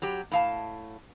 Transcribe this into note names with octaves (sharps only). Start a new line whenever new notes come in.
F#3 G4
A2 F5 A5